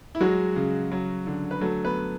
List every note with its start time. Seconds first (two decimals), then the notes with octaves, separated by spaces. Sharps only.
0.15 E4
0.21 F#3 G#3 F#4
0.56 C#3
0.92 F#3
1.27 D3
1.51 B4
1.61 F#3 A3 A4
1.85 B3 B4